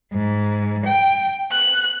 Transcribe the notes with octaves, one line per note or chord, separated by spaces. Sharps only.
G#2
G5
F#6